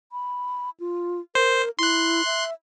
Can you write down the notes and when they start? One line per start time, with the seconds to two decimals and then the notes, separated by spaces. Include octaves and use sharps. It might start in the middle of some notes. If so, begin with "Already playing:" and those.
0.12 B5
0.80 F4
1.35 A#4 C5
1.79 E4 C6 F#6
2.25 E5